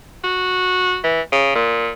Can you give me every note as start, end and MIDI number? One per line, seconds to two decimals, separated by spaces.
0.24 0.99 66
1.04 1.21 52
1.32 1.54 49
1.55 1.91 46